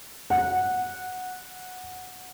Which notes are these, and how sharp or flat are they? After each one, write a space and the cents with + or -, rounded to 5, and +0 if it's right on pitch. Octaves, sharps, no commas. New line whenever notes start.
F#5 -10